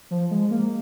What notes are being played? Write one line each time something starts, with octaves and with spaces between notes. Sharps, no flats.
F3
G#3
A#3